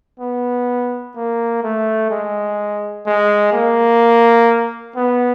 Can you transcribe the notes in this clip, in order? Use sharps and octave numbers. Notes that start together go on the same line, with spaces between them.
B3
A#3
A3
G#3
G#3
A#3
B3